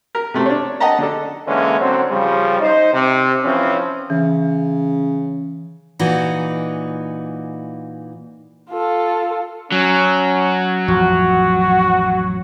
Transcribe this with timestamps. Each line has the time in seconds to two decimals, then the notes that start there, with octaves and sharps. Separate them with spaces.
0.15 A#4
0.34 C3 A3 C4
0.46 D4 C#5
0.80 D#5 F#5 G5 A5 A#5
0.98 D3 D4 A4
1.47 D3 E3 G#3 A#3 C#4
1.79 D3 F#3 C4
2.11 C#3 F3 G3
2.61 D#4 C5
2.92 C3
3.44 E3 F3 C4 C#4
4.10 C#3 E3
5.99 A#2 E3 D#4 F#4
8.70 F4 A4
9.72 F#3 C#4
10.88 A1 F2 F3 F#4